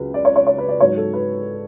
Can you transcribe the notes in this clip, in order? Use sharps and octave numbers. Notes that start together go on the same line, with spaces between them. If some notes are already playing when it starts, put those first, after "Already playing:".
Already playing: C#2 F#3 B4
D5
C#5
C#5
C#5
B4
D5
G#2 F#3 C#5
A4
B4